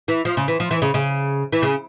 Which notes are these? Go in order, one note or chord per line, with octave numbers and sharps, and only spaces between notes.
E3
F3
C#3
E3
F3
E3
C#3
C#3
E3
C#3